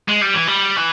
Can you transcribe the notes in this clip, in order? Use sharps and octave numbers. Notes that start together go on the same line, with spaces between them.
G#3
G3
E3
G3
E3